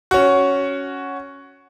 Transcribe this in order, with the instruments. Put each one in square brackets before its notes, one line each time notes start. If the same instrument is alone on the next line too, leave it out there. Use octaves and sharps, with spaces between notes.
[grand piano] C#4 F#4